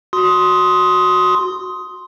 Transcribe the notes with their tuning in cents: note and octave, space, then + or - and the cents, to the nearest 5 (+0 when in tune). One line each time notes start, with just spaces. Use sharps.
F#4 -5 C6 +0 D#6 +15